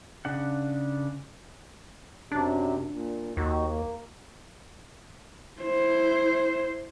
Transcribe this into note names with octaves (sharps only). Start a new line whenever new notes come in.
C#3 D4 F#5
F#2 C3 F#3 D4
A#2
D#2 D#4 F#4
A#3
E4 C5